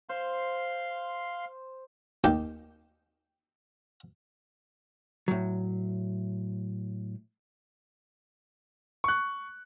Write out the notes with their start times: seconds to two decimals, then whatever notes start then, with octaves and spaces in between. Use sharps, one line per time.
0.09 C5 F5 C6
2.24 D#2 G4
5.28 A2 F#3
9.04 C#6 F#6